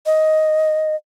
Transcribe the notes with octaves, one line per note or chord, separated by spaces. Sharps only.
D#5